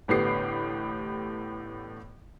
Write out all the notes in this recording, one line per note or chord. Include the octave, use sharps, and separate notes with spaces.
A1 A2 D3 B3 G4 C7